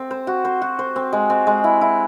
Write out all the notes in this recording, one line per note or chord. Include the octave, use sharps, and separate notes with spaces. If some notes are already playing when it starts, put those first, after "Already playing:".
Already playing: C4
C5
F#4
C5
F#4
C5
C4
G#3
C4
G#3
E4
E4